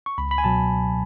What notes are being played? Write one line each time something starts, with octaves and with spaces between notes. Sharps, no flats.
C#6
C#2 B5
B5
G#5
B2 F#3 A5